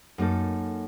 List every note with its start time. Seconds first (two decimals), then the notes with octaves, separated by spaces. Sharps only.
0.18 F#2 A#3 D#4 A4